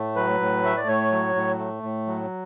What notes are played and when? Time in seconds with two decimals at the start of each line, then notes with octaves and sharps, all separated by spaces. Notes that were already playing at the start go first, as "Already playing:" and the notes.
Already playing: A2 A3
0.16 F#3 B4
0.40 A2
0.64 A3 E5
0.77 D5
0.87 A2 C#5
1.12 F#3
1.35 A2
1.59 A3
1.83 A2
2.07 F#3